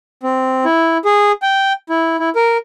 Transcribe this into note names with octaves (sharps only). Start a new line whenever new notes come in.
C4
E4
G#4
G5
E4
E4
A#4